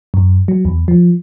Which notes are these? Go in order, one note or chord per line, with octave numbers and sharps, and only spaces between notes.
F#2
F#3
E2
F3